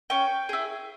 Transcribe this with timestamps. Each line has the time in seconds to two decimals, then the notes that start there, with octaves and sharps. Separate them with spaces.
0.10 C#4 G5
0.49 E4 G#4